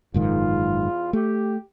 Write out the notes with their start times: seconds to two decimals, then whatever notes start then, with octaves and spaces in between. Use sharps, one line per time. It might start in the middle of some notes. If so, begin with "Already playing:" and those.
0.14 F#1 E2 G#2 D#3 F4
1.13 A3 G4